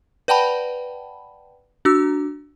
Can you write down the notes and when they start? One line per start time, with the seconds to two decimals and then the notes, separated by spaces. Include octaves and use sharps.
0.28 B4 D5 F#5 G5 A5 B5
1.85 D4 F#4 E6